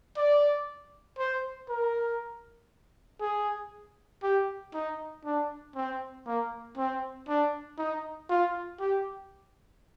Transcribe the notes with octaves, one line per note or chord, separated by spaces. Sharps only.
D5
C5
A#4
G#4
G4
D#4
D4
C4
A#3
C4
D4
D#4
F4
G4